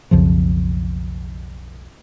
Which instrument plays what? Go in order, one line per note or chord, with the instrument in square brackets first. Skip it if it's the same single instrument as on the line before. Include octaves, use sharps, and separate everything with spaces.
[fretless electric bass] B1 F2 C#3 F3